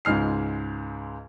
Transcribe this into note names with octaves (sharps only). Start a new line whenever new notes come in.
C#2 G#2 G#3 F6 C7